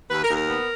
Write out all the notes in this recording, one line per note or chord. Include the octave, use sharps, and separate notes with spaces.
D#2 B4
A#4
D#2
A#4
B3